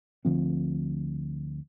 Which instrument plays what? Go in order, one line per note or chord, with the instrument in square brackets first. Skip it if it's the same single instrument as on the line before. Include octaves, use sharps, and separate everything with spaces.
[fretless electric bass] D2 D3 F3 C4